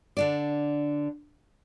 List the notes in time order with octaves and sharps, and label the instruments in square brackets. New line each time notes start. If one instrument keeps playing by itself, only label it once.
[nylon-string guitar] D3 D4 D5